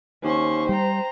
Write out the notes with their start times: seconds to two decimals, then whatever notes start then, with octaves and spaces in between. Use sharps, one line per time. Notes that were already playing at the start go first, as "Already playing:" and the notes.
0.24 D#2 C#4 C5 C#6
0.69 G3 G5 A#5